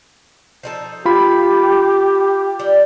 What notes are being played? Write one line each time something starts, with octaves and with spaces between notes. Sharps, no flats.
F3 D#4 A4
F4 G4 B5
G3 D#4